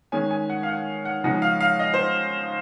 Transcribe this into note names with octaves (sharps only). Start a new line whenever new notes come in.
D#3 G#3 C#4 G#5
G#5
F#5
F5
F#5
F#5
C#3 F3 G#3 D#4 F#5
F5
F5
D#5
C5